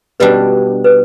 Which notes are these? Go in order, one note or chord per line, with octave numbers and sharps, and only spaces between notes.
B2 G3 D4 B4
B4